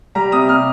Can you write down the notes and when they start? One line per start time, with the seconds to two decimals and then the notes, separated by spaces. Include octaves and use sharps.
0.15 G3 A#5
0.32 C3 D#6
0.49 C3 F6